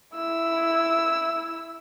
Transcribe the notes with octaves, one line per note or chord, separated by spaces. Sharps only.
E4 E6